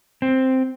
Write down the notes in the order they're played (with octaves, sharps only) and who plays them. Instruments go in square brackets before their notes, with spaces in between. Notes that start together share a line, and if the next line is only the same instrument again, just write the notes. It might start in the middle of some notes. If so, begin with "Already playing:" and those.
[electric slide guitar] C4